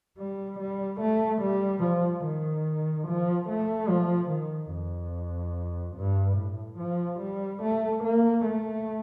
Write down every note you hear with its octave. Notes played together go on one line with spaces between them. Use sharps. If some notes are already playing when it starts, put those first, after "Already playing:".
G3
G3
A3
G3
F3
D#3
F3
A3
F3
D#3
F2
G2
A2
F3
G3
A3
A#3
A3